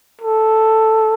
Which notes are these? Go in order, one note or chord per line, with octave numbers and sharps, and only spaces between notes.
A4